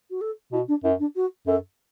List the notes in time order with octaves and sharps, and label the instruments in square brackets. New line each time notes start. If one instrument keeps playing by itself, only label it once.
[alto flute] F#4
A4
[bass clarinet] B2 [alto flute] E4
[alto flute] D4
[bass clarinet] F#2 [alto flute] E4
[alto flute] D4
F#4
[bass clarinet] F#2 [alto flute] A4